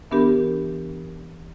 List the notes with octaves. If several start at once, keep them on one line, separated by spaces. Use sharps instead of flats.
E3 B3 D4 G4 A#4